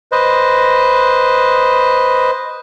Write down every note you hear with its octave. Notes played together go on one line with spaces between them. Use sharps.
B4 C5 D#5